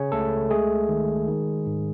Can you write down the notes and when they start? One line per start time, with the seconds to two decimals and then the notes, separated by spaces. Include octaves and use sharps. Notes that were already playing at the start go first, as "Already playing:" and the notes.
Already playing: C#3 C#4 C#5
0.12 C#2 A3 A4
0.50 G#3 A3 G#4
0.89 D#3
1.28 D#3
1.66 G#2